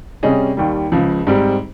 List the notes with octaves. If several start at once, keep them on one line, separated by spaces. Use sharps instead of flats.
C3 G3 C#4 G#4 D#5
D#2 D#3 G3
C#2 C#3 F3
G#2 G3 C4 G4